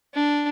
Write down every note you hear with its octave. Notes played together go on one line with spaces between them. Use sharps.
D4